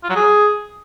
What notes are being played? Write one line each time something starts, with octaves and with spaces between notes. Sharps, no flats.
F4
F#3
G#4